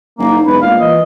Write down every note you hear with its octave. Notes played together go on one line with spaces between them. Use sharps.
F#1 A#3 D#4
E1 B4
A#2 G#3 F5
E3 D#5